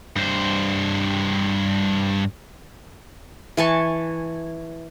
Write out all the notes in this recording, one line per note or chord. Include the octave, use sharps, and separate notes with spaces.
G2 C5
E3 G#5 A5 C#6